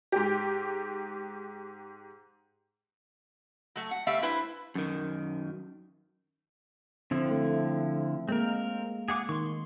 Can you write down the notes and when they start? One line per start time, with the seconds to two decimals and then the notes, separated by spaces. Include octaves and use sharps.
0.12 G#2 G4
3.75 F#3 A3
3.91 F#5
4.07 G3 A3 B3 D5 E5 F5
4.22 D4 E4 B4 C5 G#5
4.75 F#2 D#3
7.11 D3 F3 C4 E4
7.31 A3
8.29 G#3 A#3 C4 A#4
9.08 G#4 F#5 D6
9.29 D#3 C6 C#6